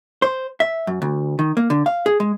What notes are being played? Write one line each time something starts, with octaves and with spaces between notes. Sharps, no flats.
C5
E5
F#2
D2
D#3
A#3
D3
F5
G#4
G#3